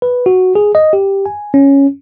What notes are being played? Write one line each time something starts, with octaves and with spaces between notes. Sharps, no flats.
B4
F#4
G#4
D#5
G4
G#5
C#4